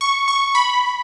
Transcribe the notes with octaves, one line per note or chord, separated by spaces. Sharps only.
C#6
C#6
B5